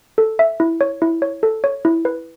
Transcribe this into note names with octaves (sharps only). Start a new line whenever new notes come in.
A4
E5
E4
C#5
E4
C#5
A4
C#5
E4
B4